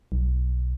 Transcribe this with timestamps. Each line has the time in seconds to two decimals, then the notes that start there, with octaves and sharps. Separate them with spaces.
0.12 B1